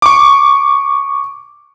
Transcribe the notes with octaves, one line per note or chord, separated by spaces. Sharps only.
C#6 D6